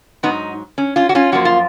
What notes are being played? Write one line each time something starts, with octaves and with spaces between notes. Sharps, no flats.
G#2 F#3 B3 D#4
C#4
C#4 F4
F#4
C#4 F4
F#2 F3 A#3 F#4
F4